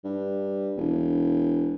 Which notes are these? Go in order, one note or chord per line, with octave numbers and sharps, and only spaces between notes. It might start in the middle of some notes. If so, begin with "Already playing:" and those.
G2
E1